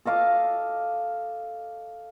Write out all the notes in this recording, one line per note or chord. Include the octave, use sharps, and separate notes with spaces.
A4 D#5 F5 D6